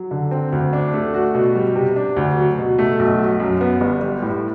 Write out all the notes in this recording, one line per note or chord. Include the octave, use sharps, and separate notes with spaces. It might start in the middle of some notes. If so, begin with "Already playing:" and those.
Already playing: F#3
D3
C4
D2
D4
A3
F#4
B2
G3
C3
D4
D2
F#3
B2
A3
B1
F#3
F#2
B3
G1
G3
A2